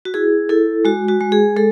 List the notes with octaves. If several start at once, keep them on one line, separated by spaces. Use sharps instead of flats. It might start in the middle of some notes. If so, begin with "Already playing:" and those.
F#4
E4 G#4
E4 A4
G#3 F#4
F#4
G#3
G#4
G#3 A4